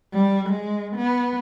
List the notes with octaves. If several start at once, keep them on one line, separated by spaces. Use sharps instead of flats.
G3
G#3
B3